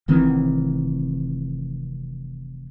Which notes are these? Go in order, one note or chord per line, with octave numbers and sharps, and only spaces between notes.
F1 D#3 E3 C4